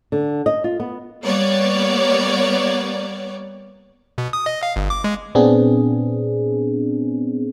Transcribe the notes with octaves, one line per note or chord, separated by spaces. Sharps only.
D3
D#5
F4
B3
G3 A#3 B3 C#5 D5
B2
D#6
D#5
F5
G1
D6
G#3
A#2 B3 C4 D4 G#4